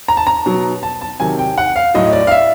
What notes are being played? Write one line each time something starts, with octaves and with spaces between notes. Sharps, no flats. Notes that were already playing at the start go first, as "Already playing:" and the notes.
A#5
A5
A#5
B2 F#3
A5
A5
C3 D#3 F#3 G#5
G5
F#5
F5
A2 F#3 D#5
D5
F5
E5